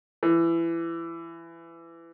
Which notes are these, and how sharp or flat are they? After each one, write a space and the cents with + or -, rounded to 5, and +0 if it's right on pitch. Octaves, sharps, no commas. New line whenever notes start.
E3 +20